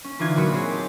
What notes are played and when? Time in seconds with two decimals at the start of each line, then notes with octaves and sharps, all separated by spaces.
0.04 C#4
0.19 D3 E3 D#4 F4 G#6
0.36 A#2 F#3 F#4 B5 C#7
0.54 C4 F#4 G#4 C#5
0.71 G4 G#4 A5